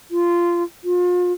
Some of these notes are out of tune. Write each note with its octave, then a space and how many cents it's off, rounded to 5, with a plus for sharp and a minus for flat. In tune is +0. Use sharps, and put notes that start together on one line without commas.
F4 -15
F4 +35